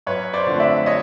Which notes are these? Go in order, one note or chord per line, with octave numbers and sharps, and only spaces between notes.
F#2 B4 C#5
C5 D5
D3 F3 A3 C4
D5 E5
C#5 D#5